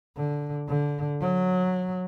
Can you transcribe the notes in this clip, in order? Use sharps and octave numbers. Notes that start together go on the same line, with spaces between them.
D3
D3
F#3